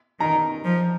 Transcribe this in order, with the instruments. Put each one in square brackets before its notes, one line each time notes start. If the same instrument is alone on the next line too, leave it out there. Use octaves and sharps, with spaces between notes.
[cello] D#3 [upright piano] A#5
[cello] F3